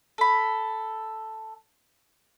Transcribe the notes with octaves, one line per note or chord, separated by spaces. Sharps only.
A4 B5